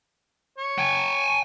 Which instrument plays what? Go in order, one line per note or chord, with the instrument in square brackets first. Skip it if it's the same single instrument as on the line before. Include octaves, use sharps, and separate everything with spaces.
[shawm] C#5
[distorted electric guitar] G5 G#5